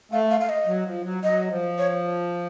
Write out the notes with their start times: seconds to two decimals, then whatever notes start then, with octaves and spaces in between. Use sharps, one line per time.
0.12 A3 F5
0.31 F5
0.41 F5
0.49 D#5
0.67 F#3
0.85 F3
1.04 F#3
1.23 F#3 D#5
1.50 F3
1.78 C#5